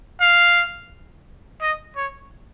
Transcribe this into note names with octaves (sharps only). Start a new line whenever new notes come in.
F5
D#5
C#5